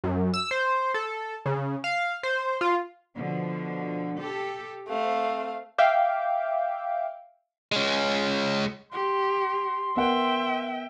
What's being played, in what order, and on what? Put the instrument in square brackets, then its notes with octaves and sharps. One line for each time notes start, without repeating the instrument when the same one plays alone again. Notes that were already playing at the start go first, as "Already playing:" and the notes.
[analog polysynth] F#2
E6
C5
A4
C#3
F5
C5
F4
[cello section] B2 D3 F3
G4 A4
[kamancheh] A3 F5 [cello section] C4
[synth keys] E5 F5 G5 D6
[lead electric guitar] G#3 C#4
[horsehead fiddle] G4 [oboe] C6
[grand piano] B3 A#4 F#5 [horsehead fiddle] E5 G5